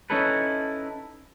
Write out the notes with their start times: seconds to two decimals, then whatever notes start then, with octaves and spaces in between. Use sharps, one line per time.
0.10 C#4 D#4 E4 A4 B4